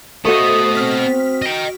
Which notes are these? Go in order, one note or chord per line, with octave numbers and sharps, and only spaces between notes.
A3 B3 F#4 A4 C5 D#5 D#6
C4 F6 B6
D#5 G5